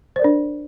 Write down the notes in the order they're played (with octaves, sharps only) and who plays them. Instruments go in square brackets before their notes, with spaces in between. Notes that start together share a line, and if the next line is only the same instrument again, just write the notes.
[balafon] C5
D5
A#4
D4